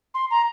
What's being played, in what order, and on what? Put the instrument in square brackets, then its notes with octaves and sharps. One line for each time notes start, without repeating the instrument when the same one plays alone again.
[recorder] C6
A#5